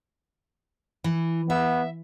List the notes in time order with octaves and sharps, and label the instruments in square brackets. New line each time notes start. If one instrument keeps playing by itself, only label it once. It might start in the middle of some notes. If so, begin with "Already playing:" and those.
[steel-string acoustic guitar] E3
[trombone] B3 [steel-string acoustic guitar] E5